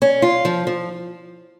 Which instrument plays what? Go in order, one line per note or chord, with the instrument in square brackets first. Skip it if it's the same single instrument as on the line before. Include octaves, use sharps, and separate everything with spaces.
[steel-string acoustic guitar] C#4
F4
F3
F3